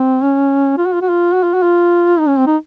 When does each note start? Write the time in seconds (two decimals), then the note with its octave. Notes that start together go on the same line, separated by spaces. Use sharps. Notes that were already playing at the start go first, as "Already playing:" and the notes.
Already playing: C4
0.22 C#4
0.78 F4
0.86 F#4
0.94 F4
1.02 F#4
1.09 F4
1.34 F#4
1.44 F4
1.54 F#4
1.63 F4
2.19 D#4
2.28 C#4
2.37 C4
2.47 D#4